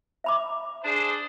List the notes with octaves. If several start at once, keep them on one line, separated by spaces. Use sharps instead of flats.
E5 B5 D6
D4 G#4 C5